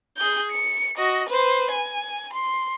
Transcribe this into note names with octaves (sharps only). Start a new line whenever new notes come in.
G#4 G6
C#7
F#4 D#5
B4 C5
G#5
C6